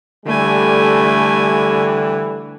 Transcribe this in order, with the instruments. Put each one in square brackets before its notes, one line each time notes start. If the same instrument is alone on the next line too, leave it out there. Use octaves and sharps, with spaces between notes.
[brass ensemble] D3 E3 G3 [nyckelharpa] A3 G#5